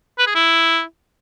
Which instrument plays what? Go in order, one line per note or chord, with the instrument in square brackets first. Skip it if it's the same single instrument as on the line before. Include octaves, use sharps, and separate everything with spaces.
[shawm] B4
G#4
E4